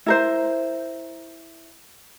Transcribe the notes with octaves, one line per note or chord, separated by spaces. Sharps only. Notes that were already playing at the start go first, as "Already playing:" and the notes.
E4 A#4 C5